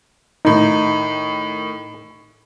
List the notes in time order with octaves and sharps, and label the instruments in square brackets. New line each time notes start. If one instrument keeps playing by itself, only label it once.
[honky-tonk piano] A2 D#3 [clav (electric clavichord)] D#4